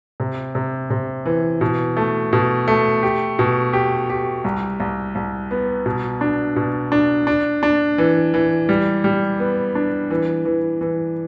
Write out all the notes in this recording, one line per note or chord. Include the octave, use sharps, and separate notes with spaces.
C3
C3
C3
E3
B2
A3
B2
A3
G4
B2
G4
G4
C2
C2
C2
B3
B2
D4
B2
D4
D4
D4
E3
E3
G3
G3
B3
D4
E3
E3
E3